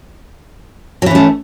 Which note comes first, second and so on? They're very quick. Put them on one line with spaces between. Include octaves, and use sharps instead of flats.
F#3 E3 C#4 A3